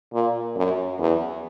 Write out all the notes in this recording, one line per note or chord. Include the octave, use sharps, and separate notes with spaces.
A#2
F#2
E2